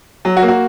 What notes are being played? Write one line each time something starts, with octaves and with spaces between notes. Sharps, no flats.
F#3
F#4
A#3
F#4